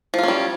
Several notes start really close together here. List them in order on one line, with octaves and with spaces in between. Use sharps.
F3 F4 C#4 G3